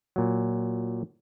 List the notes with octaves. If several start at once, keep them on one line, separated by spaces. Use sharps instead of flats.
A#2 F#3